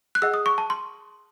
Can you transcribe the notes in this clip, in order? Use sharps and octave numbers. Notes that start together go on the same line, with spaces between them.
F#6
G#4 D#5 F#5 E6
D#6
C#6
A5
C6